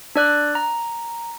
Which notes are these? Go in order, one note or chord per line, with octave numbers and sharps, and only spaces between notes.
D4 D5 F#6
A#5